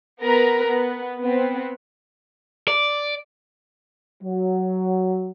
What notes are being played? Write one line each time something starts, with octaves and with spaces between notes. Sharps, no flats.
B3 A#4 B4 A#5
B3
B3 C4
D5
F#3